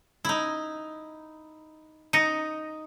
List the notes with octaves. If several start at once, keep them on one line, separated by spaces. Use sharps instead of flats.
D#4 E4
D#4 A#6 C#7 D#7